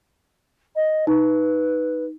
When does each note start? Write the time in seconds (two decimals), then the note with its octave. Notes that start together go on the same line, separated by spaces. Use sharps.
0.75 D#5
1.07 D#4 B4